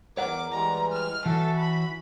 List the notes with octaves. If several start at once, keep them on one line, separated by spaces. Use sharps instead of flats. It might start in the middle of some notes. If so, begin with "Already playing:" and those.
E2 A#4 C#5 F#5 D6
E3 G3 G#3 A#5
F6
E3 C#4 F#4 A4 E5
B5